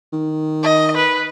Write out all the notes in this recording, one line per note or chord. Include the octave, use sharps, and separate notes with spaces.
D#3
D#5
B4